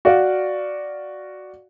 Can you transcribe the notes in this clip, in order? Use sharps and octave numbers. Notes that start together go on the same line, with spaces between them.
F#4 D5 F5